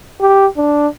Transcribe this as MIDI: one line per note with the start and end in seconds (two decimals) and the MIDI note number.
0.21 0.47 67
0.57 0.88 62